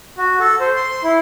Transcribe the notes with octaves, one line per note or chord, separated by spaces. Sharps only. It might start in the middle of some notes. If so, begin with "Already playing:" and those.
F#4
A4
C5
C6
E4